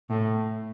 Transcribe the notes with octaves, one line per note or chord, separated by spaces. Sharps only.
A2